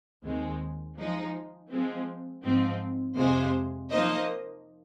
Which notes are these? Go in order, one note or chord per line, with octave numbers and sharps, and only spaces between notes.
D#2 D#3 G#3 C4
F3 G#3 D#4
F3 G#3 C4
G#2 F3 C4
F2 C3 G#3 F4 C5
F3 A#3 D#4 C5 D#5